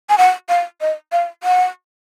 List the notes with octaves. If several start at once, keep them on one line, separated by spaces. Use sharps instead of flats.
G#5
F#5
F5
D#5
F5
F#5